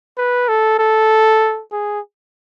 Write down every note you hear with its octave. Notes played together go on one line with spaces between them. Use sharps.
B4
A4
A4
G#4